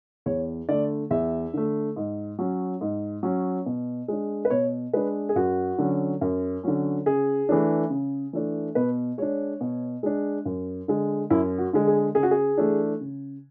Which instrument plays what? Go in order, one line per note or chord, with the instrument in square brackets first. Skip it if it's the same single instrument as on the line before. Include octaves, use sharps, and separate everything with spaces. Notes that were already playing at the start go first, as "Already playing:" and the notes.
[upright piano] E2 C#5
D3 A3 D5
E2 E5
D3 A3
G#2
F#3 C#4
G#2
F#3 C#4
B2
G#3 D4
B4
B2 C#5
G#3 D4 B4
G#4
F#2 F#4
D3 F#3 C#4
F#2
D3 F#3 C#4
C#3 G#4
E3 A3 D4
C#3
E3 A3 D4
B2 B4
G#3 D4 C#5
B2
G#3 D4
F#2
D3 G#3
F#2 E4
F#4
D3 G#3
G#4
C#3 G#4
F#4
G#4
E3 A3 D4
C#3